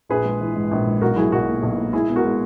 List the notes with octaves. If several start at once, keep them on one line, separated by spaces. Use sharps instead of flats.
A#1 G#4 B4
G#3
E3
G#2
A#1
G#2
B1 F#4 A#4
F#3 E4 G#4
B1 F#4 A#4
A#2
B1
A#2
G#3 E4 G#4
B2
F#4 A#4
G#3